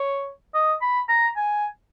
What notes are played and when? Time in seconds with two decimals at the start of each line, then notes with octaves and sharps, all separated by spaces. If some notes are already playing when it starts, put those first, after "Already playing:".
Already playing: C#5
0.54 D#5
0.81 B5
1.09 A#5
1.36 G#5